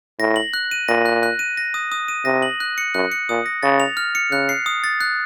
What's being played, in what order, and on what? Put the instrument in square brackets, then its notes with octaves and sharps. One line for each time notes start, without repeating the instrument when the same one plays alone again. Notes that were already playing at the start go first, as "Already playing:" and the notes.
[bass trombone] A2 [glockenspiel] A#6
[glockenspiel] F#7
F#6
D#7
[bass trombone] A#2 [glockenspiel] A#6
[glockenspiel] F#6
F#6
D#7
A#6
D#6
D#6
D#7
[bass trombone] C3 [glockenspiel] A#6
[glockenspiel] F#7
F#6
C#7
[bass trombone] F#2 [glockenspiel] F#6
[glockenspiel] C#7
[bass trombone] A#2 [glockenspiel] D#6
[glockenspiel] A#6
[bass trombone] C#3 [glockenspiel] A6
[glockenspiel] F7
F6
C#7
[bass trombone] C#3 [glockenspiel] F#6
[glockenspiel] C7
D#6
A6
F#6